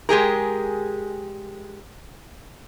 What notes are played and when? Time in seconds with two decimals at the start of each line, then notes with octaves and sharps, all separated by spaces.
0.09 G#3 G4 G#4 A#4